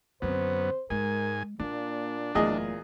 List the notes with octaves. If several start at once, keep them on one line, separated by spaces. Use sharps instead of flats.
F#2 D3 B3 C4 C5
G#2 G#3 A#4 G#5
A#2 A#3 D4
F#1 E2 A#2 A3 G#4 D#5